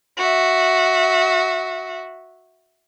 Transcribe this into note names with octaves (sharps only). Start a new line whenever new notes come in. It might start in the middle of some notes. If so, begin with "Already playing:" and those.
F#4 E5